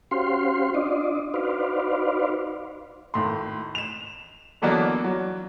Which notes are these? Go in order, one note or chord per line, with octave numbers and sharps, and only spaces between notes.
C#4 F#4 G4 C5 F5 C6
D4 F4 D5 D#5
D#4 F#4 B4 C5 D5 F5
G#1 A2 C6
E7 F7
D3 E3 F#3 A#3 B3 D4
F#3